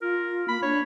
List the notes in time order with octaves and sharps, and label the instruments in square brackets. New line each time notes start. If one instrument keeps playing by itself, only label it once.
[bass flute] F4 [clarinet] A#4
[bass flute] A#3 [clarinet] B5
[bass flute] D4 [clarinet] C#5